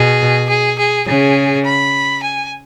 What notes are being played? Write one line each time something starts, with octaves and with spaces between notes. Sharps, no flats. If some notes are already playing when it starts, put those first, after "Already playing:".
Already playing: B2 G#4
G#4
G#4
C#3 G#4
B5
G#5